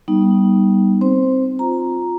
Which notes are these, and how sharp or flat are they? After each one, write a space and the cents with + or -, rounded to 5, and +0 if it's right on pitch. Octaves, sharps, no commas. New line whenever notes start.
G3 -10 B3 -30 D#4 +0
C4 +0 C5 +0
F4 +10 A#5 +0